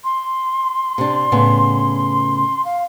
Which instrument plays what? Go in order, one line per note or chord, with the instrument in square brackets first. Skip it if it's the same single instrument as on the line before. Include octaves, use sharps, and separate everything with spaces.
[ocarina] C6
[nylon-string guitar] C3 D4
A2 C#3 B3
[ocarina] F5